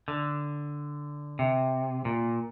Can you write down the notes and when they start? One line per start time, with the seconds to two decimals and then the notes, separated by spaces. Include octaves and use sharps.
0.08 D3
1.39 C3
2.05 A#2